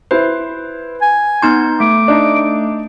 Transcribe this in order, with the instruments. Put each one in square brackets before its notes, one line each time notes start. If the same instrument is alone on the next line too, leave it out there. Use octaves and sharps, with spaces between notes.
[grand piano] E4 C5 [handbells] B4
[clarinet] G#5
[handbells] B3 D#4 G6 [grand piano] C6
[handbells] A3 [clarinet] D6
[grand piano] D4 D#4